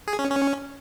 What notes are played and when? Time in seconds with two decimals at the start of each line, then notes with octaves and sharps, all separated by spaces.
0.08 G#4
0.19 C#4
0.30 C#4